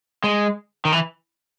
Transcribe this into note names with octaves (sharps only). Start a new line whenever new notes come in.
G#3
D#3
E3